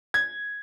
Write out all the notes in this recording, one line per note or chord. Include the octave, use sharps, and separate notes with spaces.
G#6